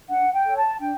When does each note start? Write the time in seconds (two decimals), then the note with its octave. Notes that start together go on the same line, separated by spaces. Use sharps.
0.09 D4 F#5
0.33 G5
0.45 A4 C#5
0.56 A5
0.80 D4 G5